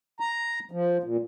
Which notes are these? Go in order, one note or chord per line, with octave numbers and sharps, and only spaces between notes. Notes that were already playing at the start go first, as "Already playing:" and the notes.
A#5
F3
A#2